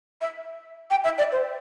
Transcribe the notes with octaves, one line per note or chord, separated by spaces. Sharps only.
E5
G5
E5
D5
C5